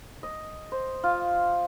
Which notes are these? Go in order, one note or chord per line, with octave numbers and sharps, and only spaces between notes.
D#5
C5
F4